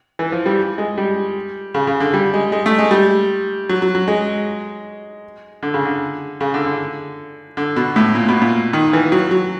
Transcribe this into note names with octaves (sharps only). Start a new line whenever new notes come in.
E3
F3
G3
G#3
G3
C#3
C#3
D3
G3
G#3
G#3
A3
G#3
G3
F#3
F#3
F#3
G#3
D3
C#3
D3
C#3
D3
D3
D3
B2
A2
A#2
B2
A#2
D#3
E3
F#3
F#3